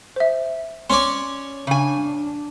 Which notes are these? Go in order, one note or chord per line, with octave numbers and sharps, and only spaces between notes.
C5 E5
C#4 C#5 D5 C6
C#3 D4 G#5